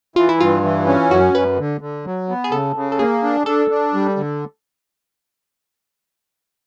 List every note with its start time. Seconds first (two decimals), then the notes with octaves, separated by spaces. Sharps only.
0.16 E3 F4
0.29 E4
0.39 G2 F4
0.63 E3
0.87 C#4
1.10 F#2 F#4
1.34 F#2 B4
1.58 D3
1.81 D3
2.06 F#3
2.29 B3
2.44 G#4
2.52 C#3 A4
2.76 C#3
2.92 A4
2.99 A#3 G#4
3.23 D4
3.46 D4 A4
3.70 D4
3.94 G3
4.17 D3